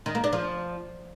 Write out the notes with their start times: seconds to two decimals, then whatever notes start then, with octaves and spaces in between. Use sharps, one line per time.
0.06 D#3
0.15 A#3
0.24 D4
0.33 F3